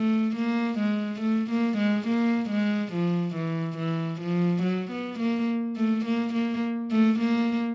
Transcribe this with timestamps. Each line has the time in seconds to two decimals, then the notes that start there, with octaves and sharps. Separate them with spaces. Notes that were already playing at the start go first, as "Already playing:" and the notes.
Already playing: A3
0.36 A#3
0.78 G#3
1.21 A3
1.50 A#3
1.78 G#3
2.07 A#3
2.49 G#3
2.92 F3
3.34 E3
3.77 E3
4.20 F3
4.62 F#3
4.91 B3
5.19 A#3
5.76 A3
6.05 A#3
6.34 A#3
6.91 A3
7.19 A#3